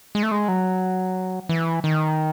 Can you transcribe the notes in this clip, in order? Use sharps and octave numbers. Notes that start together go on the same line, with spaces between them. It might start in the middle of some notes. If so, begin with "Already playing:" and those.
G#3
A3
G#3
F#3
E3
D#3